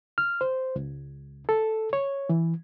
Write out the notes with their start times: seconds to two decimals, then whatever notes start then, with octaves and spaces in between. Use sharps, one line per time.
0.18 F6
0.41 C5
0.76 C#2
1.49 A4
1.93 C#5
2.29 E3